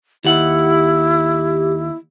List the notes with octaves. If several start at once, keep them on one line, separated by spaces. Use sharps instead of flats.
D#2 E4 G4 F#5